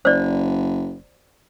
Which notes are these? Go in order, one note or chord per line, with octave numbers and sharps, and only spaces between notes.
F#1 C5 D5